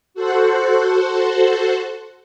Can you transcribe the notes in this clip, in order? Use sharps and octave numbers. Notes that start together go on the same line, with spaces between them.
F#4 A4 C5 F#5